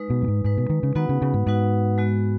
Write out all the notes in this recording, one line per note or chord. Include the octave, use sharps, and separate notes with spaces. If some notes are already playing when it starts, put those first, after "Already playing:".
Already playing: G#3 D#4 B4
B2
F#2
G#2
G#2 G#3 D#4 B4
B2
D#3
C#3
D#3 B3 D#4 F#4 B4 F#5
C#3
C#3
G#2
G#2 B3 D#4 F#4 B4 F#5
G#3 B3 F#4